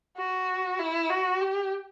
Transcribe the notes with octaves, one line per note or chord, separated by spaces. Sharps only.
F#4
E4
F#4
G4